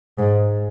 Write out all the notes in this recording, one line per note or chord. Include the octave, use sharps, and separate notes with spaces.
G#2